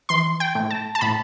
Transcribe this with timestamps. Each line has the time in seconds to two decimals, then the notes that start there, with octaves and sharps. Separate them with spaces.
0.09 E3 C6
0.40 G5
0.55 A2
0.70 A5
0.95 A5
1.01 A2 B5